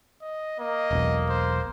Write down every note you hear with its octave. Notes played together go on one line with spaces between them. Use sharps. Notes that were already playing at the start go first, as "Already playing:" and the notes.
D#5
A#3 D#5
E1 B1
C5